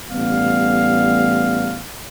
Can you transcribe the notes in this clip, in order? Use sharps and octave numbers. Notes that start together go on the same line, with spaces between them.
A1 G3 B3 F5